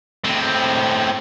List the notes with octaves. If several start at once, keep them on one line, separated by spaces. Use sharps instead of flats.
A2 C4